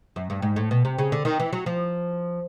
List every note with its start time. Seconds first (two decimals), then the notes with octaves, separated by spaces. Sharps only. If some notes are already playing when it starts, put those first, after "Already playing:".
0.16 F#2
0.30 G2
0.42 G#2
0.56 A2
0.71 B2
0.85 C3
0.98 C#3
1.12 D3
1.25 D#3
1.40 E3
1.53 F#3
1.66 F3